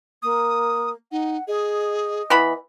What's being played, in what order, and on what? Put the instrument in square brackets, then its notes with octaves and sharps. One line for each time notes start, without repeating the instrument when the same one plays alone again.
[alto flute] A#3 [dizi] D#6
[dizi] D#4 [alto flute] F#5
[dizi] G#4 [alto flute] D#5
[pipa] E3 B3 B5